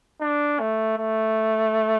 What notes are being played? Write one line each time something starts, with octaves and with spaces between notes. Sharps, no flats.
D4
A3
A3